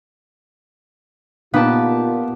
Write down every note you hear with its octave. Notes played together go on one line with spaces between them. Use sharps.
A#2 B3 D#4 F4 G4 F5 A5